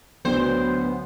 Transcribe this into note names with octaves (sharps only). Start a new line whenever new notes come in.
D2 F#3 B3 C5 D5 G5